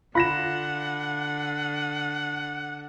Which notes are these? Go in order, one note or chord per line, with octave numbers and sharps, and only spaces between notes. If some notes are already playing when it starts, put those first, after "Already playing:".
D3 F4 F#5 B5 A#6 E7